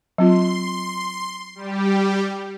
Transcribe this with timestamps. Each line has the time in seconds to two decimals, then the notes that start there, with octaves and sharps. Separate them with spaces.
0.18 F#3 C4 F4 C6
1.55 G3 G4